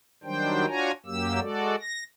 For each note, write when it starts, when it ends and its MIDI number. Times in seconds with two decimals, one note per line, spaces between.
0.24 0.66 51
0.24 0.66 54
0.24 0.66 55
0.24 0.66 62
0.24 0.66 72
0.24 0.66 79
0.67 0.91 62
0.67 0.91 65
0.67 0.91 66
0.67 0.91 73
0.67 0.91 80
0.67 0.91 82
1.06 1.40 42
1.06 1.40 54
1.06 1.40 58
1.06 1.40 67
1.06 1.40 88
1.40 1.75 56
1.40 1.75 66
1.40 1.75 69
1.40 1.75 74
1.81 2.04 94